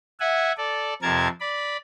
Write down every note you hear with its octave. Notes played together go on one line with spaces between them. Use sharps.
E5 F#5 G#5
A4 D5
F2 C3 A#4 A5 G#6
D5 B5